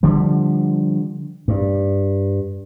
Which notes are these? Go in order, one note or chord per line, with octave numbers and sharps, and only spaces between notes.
D3 F3 G3
G2